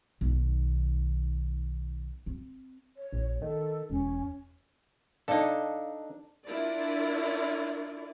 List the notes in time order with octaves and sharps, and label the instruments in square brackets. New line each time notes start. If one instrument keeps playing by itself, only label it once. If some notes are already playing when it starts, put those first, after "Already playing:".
[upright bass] B1 D#3
C4
[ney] C#5
[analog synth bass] A#1
[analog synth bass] D#3 [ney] A4
[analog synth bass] E1 [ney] C#4
[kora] D4 [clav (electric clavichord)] D#4 A4 [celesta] D5 F5
[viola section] D4 E4 F4 A#4 D5